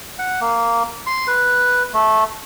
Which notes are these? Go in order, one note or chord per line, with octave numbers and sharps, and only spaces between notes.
F#5
A#3
C6
B4
A3